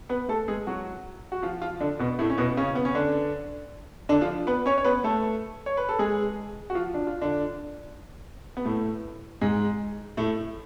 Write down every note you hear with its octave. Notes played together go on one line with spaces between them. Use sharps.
B3 B4
A3 A4
G#3 G#4
F#3 F#4
F#4
F3 F4
F3 F4
D3 D4
B2 B3
A2 A3
C#4
B2 B3
C#3 C#4
B3
C#4
D3 D4
D3 D4
F3 F4
B3 B4
C#4 C#5
C#5
B3 B4
A3 A4
C#5
B4
A4
G#3 G#4
F#4
F3 F4
D4
F4
D3 D4
B3
A2 A3
G#2 G#3
A2 A3